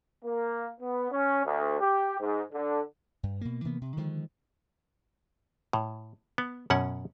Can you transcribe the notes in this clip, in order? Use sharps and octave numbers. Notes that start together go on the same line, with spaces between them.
A#3
B3
C#4
D2
G4
G#2
D3
G2
B2 A#3
C3 E3 A#3 B3
C3
D3 D#3 F3 G#3
A2
B3
F#2 B2 C#4 F#5